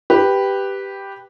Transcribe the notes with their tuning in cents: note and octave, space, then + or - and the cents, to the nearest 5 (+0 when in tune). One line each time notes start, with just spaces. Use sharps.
G4 +0 B4 +0